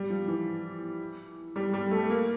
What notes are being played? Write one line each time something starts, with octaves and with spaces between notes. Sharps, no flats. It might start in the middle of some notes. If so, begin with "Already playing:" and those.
Already playing: G3
F3
E3
G3
G3
A3
A#3